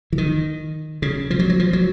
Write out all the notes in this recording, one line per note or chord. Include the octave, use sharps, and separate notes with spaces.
E3
D#3
C#3
F3
F#3
F#3
F3
F#3